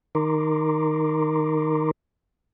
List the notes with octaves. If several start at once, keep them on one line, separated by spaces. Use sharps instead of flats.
D#3 D#4 A#4 A#5 C6 D6